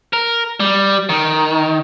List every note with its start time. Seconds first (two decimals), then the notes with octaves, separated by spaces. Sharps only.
0.13 A#4
0.60 G3
1.09 D#3